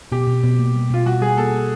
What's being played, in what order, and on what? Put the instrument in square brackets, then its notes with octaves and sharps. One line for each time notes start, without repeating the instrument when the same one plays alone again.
[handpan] B2 [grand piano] G4
[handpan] B2
B2
A#3
G3
[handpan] B2 [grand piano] F4
[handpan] G3 [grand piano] F#4
[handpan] G3 [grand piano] G#4
[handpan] A#3 [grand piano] A4
[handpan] A#3